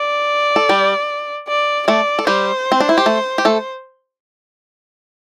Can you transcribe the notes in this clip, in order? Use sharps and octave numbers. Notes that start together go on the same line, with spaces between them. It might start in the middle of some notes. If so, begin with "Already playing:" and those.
Already playing: D5
A4
G3 G4
D5
A3 A4 D5
A4
G3 G4 C5
C4
D4
E4
G4
A3 A4
G4
A3 A4